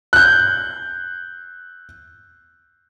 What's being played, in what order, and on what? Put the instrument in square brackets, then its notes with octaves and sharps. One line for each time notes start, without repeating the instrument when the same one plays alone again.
[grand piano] F#6 G6